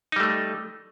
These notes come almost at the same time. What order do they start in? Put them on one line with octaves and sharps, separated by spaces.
D#4 G3 A3